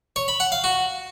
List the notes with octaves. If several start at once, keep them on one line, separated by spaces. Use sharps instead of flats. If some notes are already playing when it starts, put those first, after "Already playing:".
C#5
B5
F#5
F5
F#4